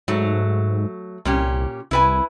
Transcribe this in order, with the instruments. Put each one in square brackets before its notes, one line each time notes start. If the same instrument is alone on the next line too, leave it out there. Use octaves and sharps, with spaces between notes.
[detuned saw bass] G#2 [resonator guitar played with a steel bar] F#3 A3
[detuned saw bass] C2 [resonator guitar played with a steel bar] A#2 C#4 G4
[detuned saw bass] C2 [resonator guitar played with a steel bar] E4 B4 G#5